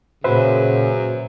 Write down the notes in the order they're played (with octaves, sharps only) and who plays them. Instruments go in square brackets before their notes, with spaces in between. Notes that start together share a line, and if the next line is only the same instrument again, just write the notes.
[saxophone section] F#2 [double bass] A#2 [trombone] C#3 [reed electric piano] B4 C5 E5